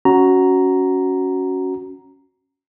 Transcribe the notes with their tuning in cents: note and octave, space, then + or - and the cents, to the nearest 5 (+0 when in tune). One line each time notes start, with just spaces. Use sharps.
C#4 +0 F#4 +0 A#5 +0